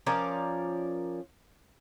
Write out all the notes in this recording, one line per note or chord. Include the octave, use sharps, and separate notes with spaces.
F3 C#4 A#4 D5